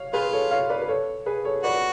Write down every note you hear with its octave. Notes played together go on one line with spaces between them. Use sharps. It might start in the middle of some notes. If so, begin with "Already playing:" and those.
Already playing: C#5 F5
F4 G#4 B4
A4 C#5
C#5 F5
B4 D5
B4
A4 C#5
G#4 B4
A4 C#5
F#4 B4 D5